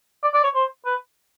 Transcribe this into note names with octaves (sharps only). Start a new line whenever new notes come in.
D5
D5
C#5
C5
B4